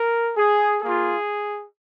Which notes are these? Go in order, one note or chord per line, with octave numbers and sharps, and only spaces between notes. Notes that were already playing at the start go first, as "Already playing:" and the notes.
Already playing: A#4
G#4
A#3 F4 G#4